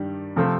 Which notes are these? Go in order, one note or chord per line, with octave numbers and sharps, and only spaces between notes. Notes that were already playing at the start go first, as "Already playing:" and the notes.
Already playing: G2 D#3 G3
C3 F3 A3 C4